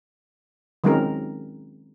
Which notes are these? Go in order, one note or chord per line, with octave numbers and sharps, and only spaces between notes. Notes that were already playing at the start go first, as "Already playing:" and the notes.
D#3 F#3 G#3 C4 C#4 A#4